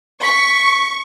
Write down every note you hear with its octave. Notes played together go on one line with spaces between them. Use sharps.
C#6 B6